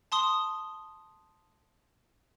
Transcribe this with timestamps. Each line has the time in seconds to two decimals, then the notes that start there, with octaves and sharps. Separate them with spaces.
0.12 A5 C6 D#6 G7